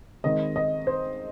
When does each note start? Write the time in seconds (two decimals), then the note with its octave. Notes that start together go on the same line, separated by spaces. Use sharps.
0.24 D#3 G#3 C4 D#5
0.56 D#5
0.87 C5